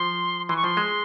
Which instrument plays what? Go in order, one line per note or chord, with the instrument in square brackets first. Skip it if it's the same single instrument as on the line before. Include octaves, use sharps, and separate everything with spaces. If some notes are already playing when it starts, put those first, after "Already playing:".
Already playing: [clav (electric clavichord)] F3 [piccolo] C6
[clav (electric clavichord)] E3 [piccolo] C6
[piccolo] C#6
[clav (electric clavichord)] F3 [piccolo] C6
[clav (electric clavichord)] G#3